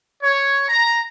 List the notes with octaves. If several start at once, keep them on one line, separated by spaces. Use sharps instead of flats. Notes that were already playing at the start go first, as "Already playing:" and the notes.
C#5
A#5